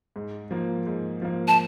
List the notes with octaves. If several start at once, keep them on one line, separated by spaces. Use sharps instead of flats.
G#2
F3 A#3
G#2
F3 A#3
A5